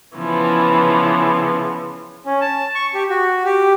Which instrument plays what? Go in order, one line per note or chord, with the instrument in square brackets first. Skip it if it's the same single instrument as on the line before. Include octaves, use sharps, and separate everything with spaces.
[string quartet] C#3 E3 F3 B3
[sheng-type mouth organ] C#4
A5
C#6
G4
F#4
G4